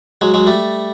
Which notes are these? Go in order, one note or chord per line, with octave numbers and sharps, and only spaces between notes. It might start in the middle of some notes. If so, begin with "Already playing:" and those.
F#3 G#3
F#3 G#3
G3 A3